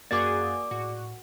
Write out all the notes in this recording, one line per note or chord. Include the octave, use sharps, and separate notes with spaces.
F#2 A#3 F#4 G#4 D5 D6 A6
A2 F#4